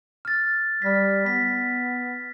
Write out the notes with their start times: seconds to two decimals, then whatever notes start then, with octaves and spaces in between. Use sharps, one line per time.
0.25 F6 A6
0.82 G3 F6 B6
1.26 B3 B6